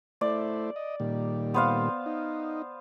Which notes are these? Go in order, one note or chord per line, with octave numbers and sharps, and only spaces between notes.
A3 E4 C5 D5
D#5
A#2 D#3 G3
B3 C5 F5
D#4